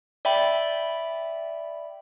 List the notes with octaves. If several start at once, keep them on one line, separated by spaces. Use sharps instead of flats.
D5 E5 G5 B5